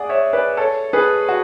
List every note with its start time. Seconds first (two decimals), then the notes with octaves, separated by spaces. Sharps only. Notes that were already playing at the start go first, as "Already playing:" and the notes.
Already playing: G#4 D5 F#5 G#5
0.09 C#5 E5
0.33 B4 D5
0.57 A4 C#5
0.93 G#4 B4
1.29 F#4